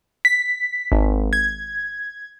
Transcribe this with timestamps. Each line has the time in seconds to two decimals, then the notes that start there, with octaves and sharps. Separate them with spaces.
0.25 B6
0.92 G#1
1.33 G#6